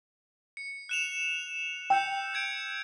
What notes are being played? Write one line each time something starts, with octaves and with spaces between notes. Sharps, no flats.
C#7
F#6 E7 F7
G5 E6 G6 C#7
G6 G#6 D7